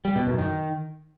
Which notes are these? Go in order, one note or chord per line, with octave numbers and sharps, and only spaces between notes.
G3
B2
F#2
D#3